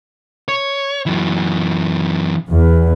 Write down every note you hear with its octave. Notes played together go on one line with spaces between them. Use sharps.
C#5
F#2 E3
E2